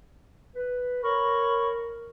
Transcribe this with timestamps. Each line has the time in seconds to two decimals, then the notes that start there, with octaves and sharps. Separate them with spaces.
0.56 B4
1.03 A#4 C#5 B5 C#6